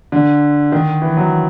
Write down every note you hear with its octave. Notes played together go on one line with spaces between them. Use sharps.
D3
D#3
E3
F#3